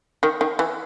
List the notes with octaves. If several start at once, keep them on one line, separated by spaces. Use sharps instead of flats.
D#3
D#3
E3